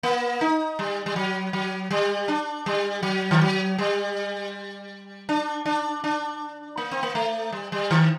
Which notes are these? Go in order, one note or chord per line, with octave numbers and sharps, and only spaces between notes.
A#3
D#4
G3
G3
F#3
F#3
G3
D4
G3
F#3
D#3
F#3
G3
D4
D4
D4
A#3
C4
A#3
A3
G3
G3
D#3